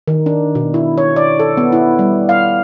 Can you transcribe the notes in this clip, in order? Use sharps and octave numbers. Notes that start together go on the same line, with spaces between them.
D#3
D4
B2
E4
C#5
D5
A4
B3
E4
G3
F5